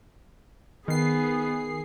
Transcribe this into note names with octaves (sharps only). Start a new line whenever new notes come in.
D#3 B3 G#4 C7